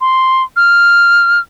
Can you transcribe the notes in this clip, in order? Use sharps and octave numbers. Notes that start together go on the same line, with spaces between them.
C6
F6